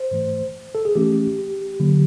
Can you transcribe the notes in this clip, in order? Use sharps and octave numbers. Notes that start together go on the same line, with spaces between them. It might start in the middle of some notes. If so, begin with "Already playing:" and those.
Already playing: C5
G#2 E3 A3
A4
G#4
E3 A3 C#4 G4
D3 F#3 A#3